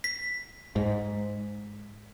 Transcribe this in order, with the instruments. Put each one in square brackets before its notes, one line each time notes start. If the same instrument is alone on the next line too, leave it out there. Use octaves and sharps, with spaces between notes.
[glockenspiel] B6
[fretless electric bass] G#2